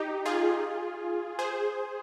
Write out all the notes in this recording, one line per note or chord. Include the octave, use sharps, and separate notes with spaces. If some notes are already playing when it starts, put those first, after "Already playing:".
Already playing: D#4 G4
F4 G#4
G#4 C5